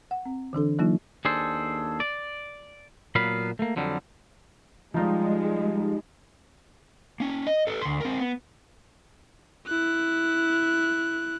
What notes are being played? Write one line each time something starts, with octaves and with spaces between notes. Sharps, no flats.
F#5
C4
D3 E3 D4 A4
E3 F#3 A#3 D#4 F4
D#2 D4 G#4 A4 C5
D5
A#2 F#3 A#3 B3 F5 B5
A3 A#3
F2 D3 F#3 G3
F3 G3 G#3 D#4 F4
A#3 C#4
D#5
A4 B4
D2 C6
C4 A#4
B3
E4 F#6